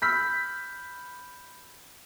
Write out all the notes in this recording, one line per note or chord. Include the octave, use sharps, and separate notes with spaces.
B5 E6 F6 G6 B6